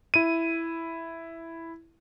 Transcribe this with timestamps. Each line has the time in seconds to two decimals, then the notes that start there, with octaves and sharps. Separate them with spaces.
0.14 E4 D#7